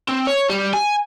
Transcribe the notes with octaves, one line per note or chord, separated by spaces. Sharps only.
C4
C#5
G3
G#5